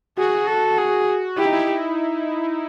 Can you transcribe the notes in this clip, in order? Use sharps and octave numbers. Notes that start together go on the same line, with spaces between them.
F#4 G#4
A4
G#4
E4 G4
D#4
E4